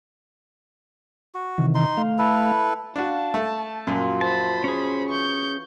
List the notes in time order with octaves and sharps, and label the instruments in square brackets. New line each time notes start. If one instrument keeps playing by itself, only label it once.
[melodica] F#4
[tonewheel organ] C3 D#3 E3
[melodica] D#4 C6
[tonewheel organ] A3 F5
[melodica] E4 A4 B4
[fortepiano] D4 F#4 [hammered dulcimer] F5 [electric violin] A5
[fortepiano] A3
[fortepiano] F#2 A#2 [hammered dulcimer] F3 F#4
[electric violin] C5 B5 [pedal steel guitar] A5
[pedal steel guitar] C#4 G#4
[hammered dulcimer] E3 [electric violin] C#6 G6